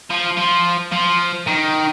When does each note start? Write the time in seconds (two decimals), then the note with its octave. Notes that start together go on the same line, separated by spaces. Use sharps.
0.10 F3
0.37 F3
0.92 F3
1.47 D#3